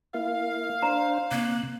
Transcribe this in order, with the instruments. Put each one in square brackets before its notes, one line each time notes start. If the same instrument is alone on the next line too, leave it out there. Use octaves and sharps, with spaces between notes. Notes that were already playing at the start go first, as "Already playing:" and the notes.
[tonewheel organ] A#3 E4 [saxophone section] F5
[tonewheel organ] D4 C5 [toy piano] A#5
[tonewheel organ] C3 F#6 [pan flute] A#3